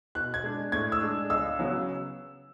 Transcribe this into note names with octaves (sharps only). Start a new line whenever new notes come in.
B2 F#6
G#6
G#3 D4
A2 G#6
E6
G#3 D4
C#2 E6
C#3 F#3 B3